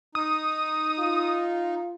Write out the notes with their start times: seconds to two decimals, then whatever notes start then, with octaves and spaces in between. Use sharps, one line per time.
0.15 D#4 D#6
0.99 F4